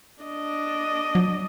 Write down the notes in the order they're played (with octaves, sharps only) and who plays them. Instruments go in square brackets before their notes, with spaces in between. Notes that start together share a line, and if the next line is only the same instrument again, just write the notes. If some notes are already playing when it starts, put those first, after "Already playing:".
[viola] D4 D#5
[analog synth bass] F#3